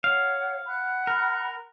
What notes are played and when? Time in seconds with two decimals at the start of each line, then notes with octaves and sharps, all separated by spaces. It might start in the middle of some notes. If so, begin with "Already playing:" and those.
0.04 C#5 F5 F#5
0.65 F#5 B5 F#6
1.07 A#4